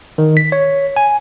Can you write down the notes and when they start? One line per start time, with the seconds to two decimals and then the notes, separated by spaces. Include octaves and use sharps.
0.18 D#3
0.37 B6
0.52 C#5
0.96 G#5